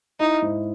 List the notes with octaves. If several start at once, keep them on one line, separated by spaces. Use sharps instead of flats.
D#4 E4
G#2